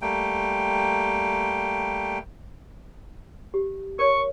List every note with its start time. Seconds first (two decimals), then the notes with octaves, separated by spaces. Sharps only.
0.02 G3 A3 A#3 G5
3.54 G4
3.99 A#4 C#5 C#6